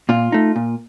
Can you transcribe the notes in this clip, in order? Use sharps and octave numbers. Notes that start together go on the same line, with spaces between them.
A#2 F4
A3 D#4
A#2